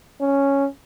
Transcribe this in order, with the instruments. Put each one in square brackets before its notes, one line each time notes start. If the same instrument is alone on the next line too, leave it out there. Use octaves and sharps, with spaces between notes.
[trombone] C#4